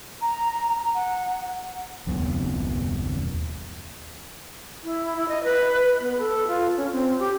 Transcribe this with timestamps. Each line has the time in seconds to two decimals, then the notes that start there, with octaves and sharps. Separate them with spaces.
0.22 A#5
0.95 F#5
2.07 F#1 D#2 F#3 B3
4.84 E4
5.16 E4
5.29 D#5
5.44 B4
6.00 B3
6.18 A4
6.47 F4
6.77 C#4
6.92 C4
7.19 G4